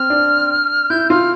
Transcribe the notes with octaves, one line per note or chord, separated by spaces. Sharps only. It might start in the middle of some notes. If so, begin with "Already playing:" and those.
Already playing: C4 F6
D4
E4 G6
F4 F6